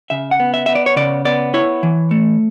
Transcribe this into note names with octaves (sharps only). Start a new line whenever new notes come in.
C#3 E5
F#5
B3
E5
B3 E5
D5
C#5
C#3 D5
B3 D5
E4 C#5
E3
A3